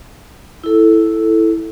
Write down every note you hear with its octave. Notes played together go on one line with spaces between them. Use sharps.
E4 A4